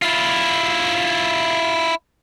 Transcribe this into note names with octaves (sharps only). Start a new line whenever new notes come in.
E4 F4